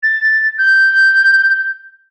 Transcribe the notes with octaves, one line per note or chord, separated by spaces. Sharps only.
A6
G6